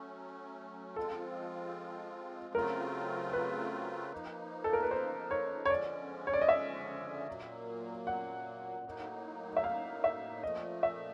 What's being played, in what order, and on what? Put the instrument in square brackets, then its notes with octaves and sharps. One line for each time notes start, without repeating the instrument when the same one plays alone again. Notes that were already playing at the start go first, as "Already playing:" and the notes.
Already playing: [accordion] F#3 A3 C#4
[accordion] F3 G#3 C4 F4 [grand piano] A4
[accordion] C#3 F#3 A3 C4 F4 [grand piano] A#4
[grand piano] B4
[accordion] F3 A#3 D#4
[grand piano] A4
A#4
B4
C5
C#5
C#5
[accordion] D3 F3 G#3 C#4 [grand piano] D5
[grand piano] C#5
D5
D#5
E5
[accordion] A#2 F#3 A#3
[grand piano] F#5
[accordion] A2 F#3 A#3 D#4
[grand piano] E5
F5
E5
[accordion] A#2 F3 A3 [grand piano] D#5
[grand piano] E5